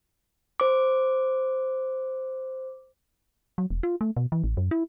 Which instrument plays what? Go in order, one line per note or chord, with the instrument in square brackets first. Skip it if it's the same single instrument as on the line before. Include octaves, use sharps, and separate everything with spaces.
[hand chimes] C5 D6
[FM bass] F#3
E1
F4
A3
B2
E3
A1
F#2
E4